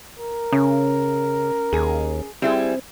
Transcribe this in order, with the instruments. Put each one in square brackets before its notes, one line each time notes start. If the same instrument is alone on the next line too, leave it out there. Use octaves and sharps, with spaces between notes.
[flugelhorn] A#4
[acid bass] C#3 [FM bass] C#4
[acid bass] D#2 [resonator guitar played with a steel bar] G#4
[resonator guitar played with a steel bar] G3 E4 G#4 [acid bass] C4